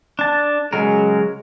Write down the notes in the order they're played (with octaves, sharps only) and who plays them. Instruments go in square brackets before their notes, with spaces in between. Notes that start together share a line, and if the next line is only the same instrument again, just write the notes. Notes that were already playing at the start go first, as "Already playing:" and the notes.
[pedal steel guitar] D4 A5
[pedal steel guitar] C#3 F#3 A#4 [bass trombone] G#3